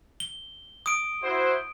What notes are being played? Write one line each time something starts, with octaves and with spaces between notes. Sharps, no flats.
G7
D#6 D7
E4 F#4 C5